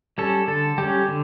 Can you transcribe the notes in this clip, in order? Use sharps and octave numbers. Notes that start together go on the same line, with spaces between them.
G3 C#4 A4
D3 A4
G3 C#4 G4
D3